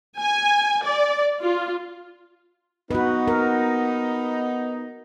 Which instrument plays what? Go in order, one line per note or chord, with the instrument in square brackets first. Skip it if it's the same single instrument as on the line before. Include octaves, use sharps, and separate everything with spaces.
[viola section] G#5
D5
F4
[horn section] B3 D#4 [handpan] F#4 B4
[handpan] A#4